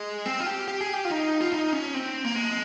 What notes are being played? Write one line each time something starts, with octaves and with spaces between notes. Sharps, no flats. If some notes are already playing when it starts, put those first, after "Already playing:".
Already playing: G#3
C4
F4
G4
G4
G#4
G4
F4
D#4
F4
D#4
C#4
C4
A#3
G#3